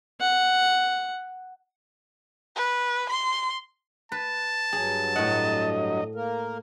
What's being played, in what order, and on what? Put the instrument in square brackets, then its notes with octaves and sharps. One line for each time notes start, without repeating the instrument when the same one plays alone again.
[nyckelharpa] F#5
[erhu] B4
C6
[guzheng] B4 [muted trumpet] A5
[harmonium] G2 F#3 [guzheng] G#4
[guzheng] A2 F#5 [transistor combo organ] D#5
[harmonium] A#3 A#4